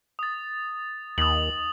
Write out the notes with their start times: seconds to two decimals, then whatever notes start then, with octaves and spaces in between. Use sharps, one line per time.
0.19 D#6 A6
1.18 D#2 D#6 F#7